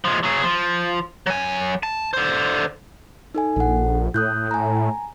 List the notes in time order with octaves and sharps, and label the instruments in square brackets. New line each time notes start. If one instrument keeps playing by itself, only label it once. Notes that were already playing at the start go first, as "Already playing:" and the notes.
[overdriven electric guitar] F3 G#3
F#3 G#4
F3
F#3 G#5
A5
D3 C5
[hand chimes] D#4 A4 G#5
[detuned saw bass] A#1 [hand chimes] A4 F#5
[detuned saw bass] A2 [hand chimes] D#6 F#6 G6
[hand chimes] G#5 A#5